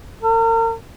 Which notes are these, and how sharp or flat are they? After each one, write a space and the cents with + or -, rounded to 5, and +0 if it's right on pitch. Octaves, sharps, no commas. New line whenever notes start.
A#4 -40